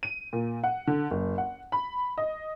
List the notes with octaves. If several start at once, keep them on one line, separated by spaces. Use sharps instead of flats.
D#7
A#2
F#5
D3
F#1
F#5
B5
D#5